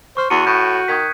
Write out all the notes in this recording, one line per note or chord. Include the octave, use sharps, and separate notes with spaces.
C5 C#6 F6
E2 F#4 C#7 D#7
A2 F#6 G6
D#3 D#6 G#6 B6